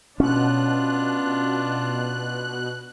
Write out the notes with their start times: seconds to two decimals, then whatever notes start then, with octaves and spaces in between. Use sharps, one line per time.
0.20 B2 C#4 D4 F4 F#6